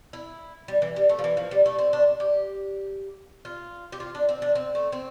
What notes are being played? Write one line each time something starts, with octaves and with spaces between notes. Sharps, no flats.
E4
G3
E3
G3
A3
F3
E3
F3
G3
A3
C4
D4
G4
F4
G4
F4
D4
C4
D4
C4
A3
C4